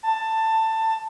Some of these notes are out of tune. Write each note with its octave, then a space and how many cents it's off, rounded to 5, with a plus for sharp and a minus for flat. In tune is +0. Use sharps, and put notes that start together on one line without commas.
A5 +15